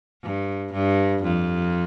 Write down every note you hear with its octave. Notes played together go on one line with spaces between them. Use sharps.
G2
G2
F2